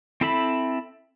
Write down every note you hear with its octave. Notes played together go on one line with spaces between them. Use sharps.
C4 E4 A4 E5 B5